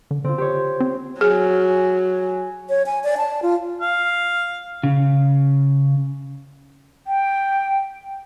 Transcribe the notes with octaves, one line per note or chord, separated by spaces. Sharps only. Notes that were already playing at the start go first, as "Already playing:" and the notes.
D3
D3 C4 F4
G4 C5 C#5
C4
F#3 G#4 G#5
C#5
G#5
D5
A5
F4
F5
C#3
G5